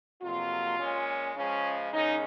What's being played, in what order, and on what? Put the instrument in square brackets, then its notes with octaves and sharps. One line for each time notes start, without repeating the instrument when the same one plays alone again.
[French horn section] F2 C3 F#3 A#3 F4
A#2 G#3 C#4
C#3 F3 G#3 C#4
D#2 C#3 G#3 C#4 D#4